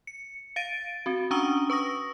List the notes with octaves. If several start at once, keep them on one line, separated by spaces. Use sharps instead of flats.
C#7
F5 A6 D7 D#7
C4 F#4
C#4 D4 A#5 C#6 D#6 G7
B4 C#6 D#6 A#6